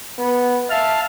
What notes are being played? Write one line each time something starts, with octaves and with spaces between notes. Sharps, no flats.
B3
E5 F5 A5 F6